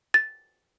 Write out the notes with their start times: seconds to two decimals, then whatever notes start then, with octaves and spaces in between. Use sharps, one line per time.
0.14 A6